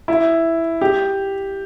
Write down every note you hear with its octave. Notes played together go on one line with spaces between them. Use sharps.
E4
G4